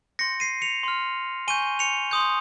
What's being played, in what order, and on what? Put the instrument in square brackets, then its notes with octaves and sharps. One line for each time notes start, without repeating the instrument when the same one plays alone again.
[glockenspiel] C6 G6 A#6 C#7
C7 D#7
C#7 F7
C6 F6
G#5 C#6 G6 D#7 G7
C#7 F7
C6 D#6 G6